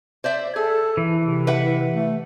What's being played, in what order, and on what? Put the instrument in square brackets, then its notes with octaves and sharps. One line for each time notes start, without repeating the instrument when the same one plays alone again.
[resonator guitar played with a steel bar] C5 D5 E5
[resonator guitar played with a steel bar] G#4 [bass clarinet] A4
[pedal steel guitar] E3
[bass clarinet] C3
[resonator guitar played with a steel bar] B4 E5 F#5
[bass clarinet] A3